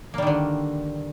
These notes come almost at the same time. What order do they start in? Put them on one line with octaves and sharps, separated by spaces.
A#3 G3 D#3 D3